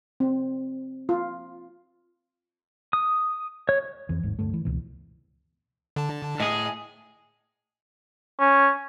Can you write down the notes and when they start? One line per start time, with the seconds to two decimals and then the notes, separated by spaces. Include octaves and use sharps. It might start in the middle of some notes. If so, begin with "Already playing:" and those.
0.20 C4
1.09 F4
2.93 D#6
3.69 C#5
4.09 F2 E3
4.23 G1 D#2 G#2
4.39 D1 D2 G2 A3
4.53 E3
4.65 C#2 B2 E3
5.96 D3 A5
6.40 A2 G#4 D#5
8.39 C#4